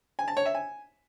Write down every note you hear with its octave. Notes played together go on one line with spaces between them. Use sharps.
G#5
A5
C#5
E5
G#5